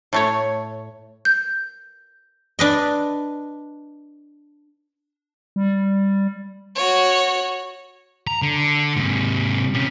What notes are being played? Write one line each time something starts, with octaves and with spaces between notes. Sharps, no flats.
A2 A3 C#5
G6
D4 B4 D#5
G3
F#4 C#5
A#5
D3
G#2 C3
C3 C#4